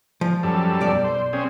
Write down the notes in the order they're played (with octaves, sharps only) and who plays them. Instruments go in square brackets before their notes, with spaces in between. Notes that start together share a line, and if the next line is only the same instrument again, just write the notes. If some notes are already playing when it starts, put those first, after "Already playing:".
[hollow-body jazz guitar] F3
[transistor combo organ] F#2 G3 A4
[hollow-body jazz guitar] B1 D5
[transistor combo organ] C5
C4 C#4 G#4